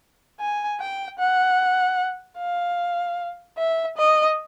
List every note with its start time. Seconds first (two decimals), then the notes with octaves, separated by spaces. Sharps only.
0.40 G#5
0.80 G5
1.19 F#5
2.38 F5
3.58 E5
3.97 D#5